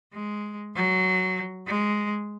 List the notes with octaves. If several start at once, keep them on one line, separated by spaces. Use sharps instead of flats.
G#3
F#3
G#3